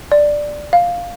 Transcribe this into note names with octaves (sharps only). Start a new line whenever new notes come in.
D5
F5